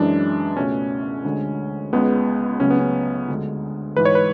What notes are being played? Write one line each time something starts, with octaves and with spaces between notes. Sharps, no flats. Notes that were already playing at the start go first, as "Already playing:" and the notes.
Already playing: F#2 E3 G#3 D4
C#2 B2 A3 C#4
D2 D3 G#3
C#2 C#3 G#3 B3
C#2 C#3 F#3 A3 C#4
B3
C#4
D2 D3 G#3
G#2 E3 G#3 B4
C#5
B4